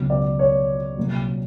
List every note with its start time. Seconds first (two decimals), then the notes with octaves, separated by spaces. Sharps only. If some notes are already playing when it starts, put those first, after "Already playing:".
Already playing: C#2 B2 F#3
0.10 D5
0.39 C#5
0.97 C2 A#2 F#3